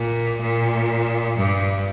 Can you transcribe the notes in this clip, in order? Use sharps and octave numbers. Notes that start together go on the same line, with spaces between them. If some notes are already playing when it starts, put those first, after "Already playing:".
Already playing: A#2
A#2
G2